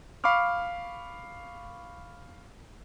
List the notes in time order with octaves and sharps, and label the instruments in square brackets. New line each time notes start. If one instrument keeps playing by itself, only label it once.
[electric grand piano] F5 B5 C#6 D6 F6